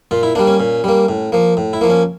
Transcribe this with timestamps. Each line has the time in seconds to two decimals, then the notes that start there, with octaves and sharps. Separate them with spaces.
0.11 A#2 F4
0.23 E4
0.35 G3 A#3 D4
0.47 C#4
0.60 A#2
0.84 G3 A#3
1.08 A2
1.32 F3 A#3
1.57 A2
1.73 E4
1.81 F3 A#3
1.90 C#4